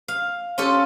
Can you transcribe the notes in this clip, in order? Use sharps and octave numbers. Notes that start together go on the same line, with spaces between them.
F5
C#4 F4 G4 A4